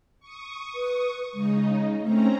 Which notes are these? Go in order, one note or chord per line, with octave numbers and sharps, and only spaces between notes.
C#6 D#6
B4
C#3 G#3 D#4
A3 C4 C#4 A#5